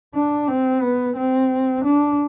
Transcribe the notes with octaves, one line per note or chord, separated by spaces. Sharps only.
D4
C4
B3
C4
D4